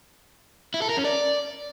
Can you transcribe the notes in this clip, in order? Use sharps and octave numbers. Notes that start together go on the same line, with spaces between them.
E4
A4
A#4
C#4
D5